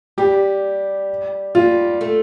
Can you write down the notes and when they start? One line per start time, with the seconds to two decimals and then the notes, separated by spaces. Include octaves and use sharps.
0.18 G3 G4
1.55 G3 F4
2.01 A3